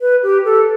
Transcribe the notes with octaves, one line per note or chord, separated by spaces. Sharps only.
B4
G4
A4